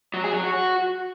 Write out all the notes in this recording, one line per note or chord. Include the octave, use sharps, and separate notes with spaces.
F#3
G#4
F#3
F#4